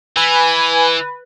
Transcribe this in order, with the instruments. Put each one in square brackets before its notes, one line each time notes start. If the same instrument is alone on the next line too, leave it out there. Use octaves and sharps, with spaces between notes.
[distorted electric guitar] E3 [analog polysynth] B4 [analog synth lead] G#5